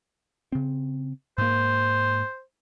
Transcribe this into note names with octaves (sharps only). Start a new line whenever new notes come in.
C#3 C4
G#2 A#3 C5